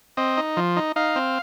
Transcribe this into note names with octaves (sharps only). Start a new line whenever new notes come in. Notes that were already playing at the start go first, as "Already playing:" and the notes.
C4 D#5
D#4
F3
D#4
D#4 F5
C4